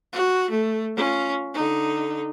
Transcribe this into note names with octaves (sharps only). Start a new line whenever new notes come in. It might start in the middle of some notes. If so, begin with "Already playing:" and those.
F#4
A3
C#4 F4
D3 D#4